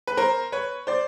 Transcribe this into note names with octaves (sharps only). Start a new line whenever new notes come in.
B4
A#4 C5
B4 C#5
C5 D5